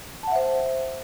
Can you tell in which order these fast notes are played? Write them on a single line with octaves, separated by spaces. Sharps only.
A5 F#5 E5 C5